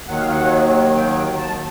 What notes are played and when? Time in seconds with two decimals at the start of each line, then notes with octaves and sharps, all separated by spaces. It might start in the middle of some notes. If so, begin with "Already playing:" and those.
0.08 D#2 D#3 F#3 F#5
0.20 F5
0.32 F#5
0.95 G5
1.38 A5